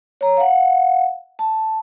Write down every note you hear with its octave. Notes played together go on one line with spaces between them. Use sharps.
C#5 A#5
F5 F#5
A5